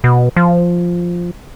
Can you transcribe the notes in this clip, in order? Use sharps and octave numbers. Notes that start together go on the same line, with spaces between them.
B2
F3